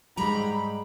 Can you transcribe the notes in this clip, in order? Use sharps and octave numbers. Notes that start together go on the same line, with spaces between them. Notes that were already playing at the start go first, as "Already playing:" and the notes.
G#2 G3 A#5 B5